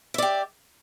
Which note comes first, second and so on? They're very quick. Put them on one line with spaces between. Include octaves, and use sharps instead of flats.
E5 D5 G4